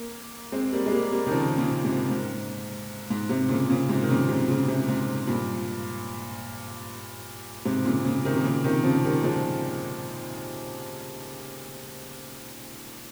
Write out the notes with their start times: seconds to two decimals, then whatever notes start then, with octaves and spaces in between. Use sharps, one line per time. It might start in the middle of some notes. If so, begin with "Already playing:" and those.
Already playing: A#3
0.52 G#3 C4
0.72 G3 A#3
0.86 G#3
0.91 G3 A#3
1.12 G3 A#3
1.27 D#3
1.32 C#3 F3
1.58 A#2 C#3
1.84 G#2 C3
2.11 G#2
3.10 G#2
3.29 G#2 C3
3.49 A#2 C#3
3.69 A#2 C#3
3.89 G#2 C3
4.02 D#3
4.09 A#2 C#3
4.29 G#2 C3
4.48 A#2 C#3
4.68 G#2 C3
4.88 G#2
5.27 G2 A#2
7.65 G#2 C3
7.85 A#2 C#3
8.05 A#2 C#3
8.25 C3 D#3
8.36 C3
8.44 A#2 C#3
8.64 C3 D#3
8.84 C#3 F3
9.04 D#3 G3
9.23 F3 G#3